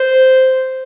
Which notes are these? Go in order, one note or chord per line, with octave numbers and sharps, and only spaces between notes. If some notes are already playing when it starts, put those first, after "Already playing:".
Already playing: C5